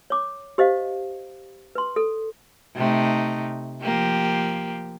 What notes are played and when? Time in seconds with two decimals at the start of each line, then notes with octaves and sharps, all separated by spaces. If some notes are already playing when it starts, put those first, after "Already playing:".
0.10 C#5 D6
0.58 G4 C5 D#5 F5
1.75 B4 C6
1.96 A4
2.76 C3 A3 D#4
3.82 F3 A#3 G4